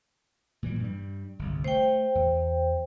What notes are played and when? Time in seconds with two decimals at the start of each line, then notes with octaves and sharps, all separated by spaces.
0.63 A#2 E3 G3
0.80 G2 G3
1.39 G1 C2
1.64 A3 C5 G5
2.15 E2